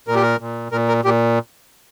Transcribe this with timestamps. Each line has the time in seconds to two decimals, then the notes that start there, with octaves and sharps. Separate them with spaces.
0.08 A#2 A#4
0.15 G4
0.22 A#4
0.40 A#2
0.72 A#2 A#4
0.88 A#4
1.05 A#2 G4